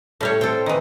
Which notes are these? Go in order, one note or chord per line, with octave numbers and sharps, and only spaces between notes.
A2 G3 A4 C#5
C4 A4 G5
D#3 E3